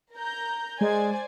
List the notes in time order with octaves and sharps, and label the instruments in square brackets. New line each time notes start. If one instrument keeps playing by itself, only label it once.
[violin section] A#4 A#5 G6
[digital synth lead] G#3 [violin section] C5 D5 G#5